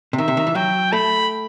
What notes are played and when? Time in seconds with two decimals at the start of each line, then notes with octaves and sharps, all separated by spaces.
0.13 C3
0.18 D#3 E5
0.28 C3
0.37 D#3
0.47 E3
0.55 F#3 G5
0.92 A3 B5